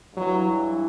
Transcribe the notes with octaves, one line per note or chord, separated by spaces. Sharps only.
G2 E3 F#3